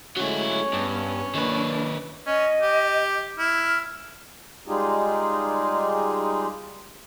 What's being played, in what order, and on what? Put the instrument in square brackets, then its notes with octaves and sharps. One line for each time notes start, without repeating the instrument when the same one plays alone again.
[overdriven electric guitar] F#3 E4 [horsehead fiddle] G#3 A3 [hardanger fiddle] C#4 C#5
[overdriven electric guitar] G2 [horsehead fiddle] B3
[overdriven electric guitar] D#3 B4 [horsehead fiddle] A#3 D4
[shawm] C#4 [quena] D#5
[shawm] G4
[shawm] E4 [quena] F6
[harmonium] G3 G#3 D#4 F4 G4 G#4